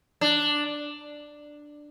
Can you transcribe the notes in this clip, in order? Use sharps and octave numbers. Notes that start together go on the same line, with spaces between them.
D4